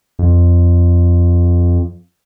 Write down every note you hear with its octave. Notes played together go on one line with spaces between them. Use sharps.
F2